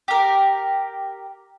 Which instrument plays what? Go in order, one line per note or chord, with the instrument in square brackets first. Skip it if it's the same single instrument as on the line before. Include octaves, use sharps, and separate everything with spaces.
[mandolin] G4 A#4